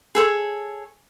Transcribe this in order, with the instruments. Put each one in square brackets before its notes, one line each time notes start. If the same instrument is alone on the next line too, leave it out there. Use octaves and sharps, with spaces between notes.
[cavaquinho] G#4 A4 C5 C#5